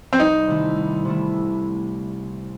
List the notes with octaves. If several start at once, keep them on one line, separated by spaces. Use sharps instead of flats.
C4
C2 D#4
C3 D#3 A3 E4
C2
C3 D#3 A3 E4